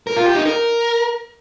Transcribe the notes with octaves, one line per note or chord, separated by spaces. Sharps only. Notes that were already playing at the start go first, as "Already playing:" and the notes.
A#4
F4
G4
D#4
A#4